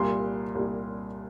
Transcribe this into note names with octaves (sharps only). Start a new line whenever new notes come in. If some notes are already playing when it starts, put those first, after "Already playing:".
Already playing: C2 A#2 G3 C6
C2 A#2 G3